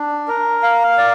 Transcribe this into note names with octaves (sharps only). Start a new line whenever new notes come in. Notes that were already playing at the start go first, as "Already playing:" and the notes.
Already playing: D4
A#4
F5
D5